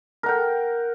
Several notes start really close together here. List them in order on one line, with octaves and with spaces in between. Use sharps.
A#4 F#5 G5